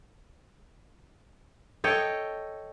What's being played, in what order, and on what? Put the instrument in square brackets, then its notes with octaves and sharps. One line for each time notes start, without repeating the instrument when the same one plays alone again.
[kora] A4 C#5 D#5 G5